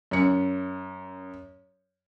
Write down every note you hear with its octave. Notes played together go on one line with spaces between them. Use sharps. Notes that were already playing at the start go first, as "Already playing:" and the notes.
F#2 C#7